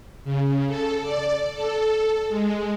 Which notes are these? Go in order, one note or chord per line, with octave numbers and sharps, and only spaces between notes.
C#3
A4
D5
A4
G#3